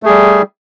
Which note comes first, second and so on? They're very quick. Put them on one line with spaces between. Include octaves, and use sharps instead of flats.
A3 G#4 G3